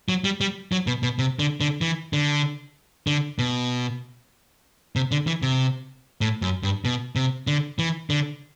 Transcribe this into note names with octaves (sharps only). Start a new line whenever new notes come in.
F#3
G3
G3
F#3
B2
B2
C3
D3
D3
E3
D3
D3
B2
C3
D3
E3
C3
A2
F#2
G2
B2
C3
D3
E3
D3